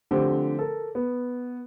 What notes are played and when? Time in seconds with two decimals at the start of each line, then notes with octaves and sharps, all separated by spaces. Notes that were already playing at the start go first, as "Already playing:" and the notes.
0.11 D3 F3 A3 C4 G4
0.59 A4 A#4
0.95 B3